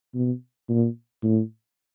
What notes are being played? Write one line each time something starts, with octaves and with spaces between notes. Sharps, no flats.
B2
A#2
A2